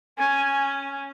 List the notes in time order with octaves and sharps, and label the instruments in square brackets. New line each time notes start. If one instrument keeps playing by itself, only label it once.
[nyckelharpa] C#4 [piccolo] G#5